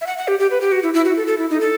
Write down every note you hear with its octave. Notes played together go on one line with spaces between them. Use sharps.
E5
F#5
F#5
G4
G4
B4
G4
F#4
E4
E4
F#4
A4
A4
E4
D#4
A4